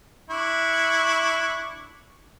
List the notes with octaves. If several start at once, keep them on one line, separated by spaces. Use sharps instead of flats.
D4 E4 C#6